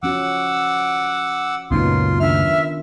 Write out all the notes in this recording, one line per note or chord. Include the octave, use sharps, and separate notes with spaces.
F3 C#4 F#4 F#5 D6 E6
C#2 F#2 A#2 B3 C#4 D#4 F4 C6
D#3 D4 F4 E5 F6